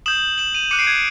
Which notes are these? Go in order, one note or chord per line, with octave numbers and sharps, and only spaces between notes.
D#6 G6 E7 F#7
E7 F#7
D#7 F7
D6 F#6 C#7 D#7
C7 D7
G#6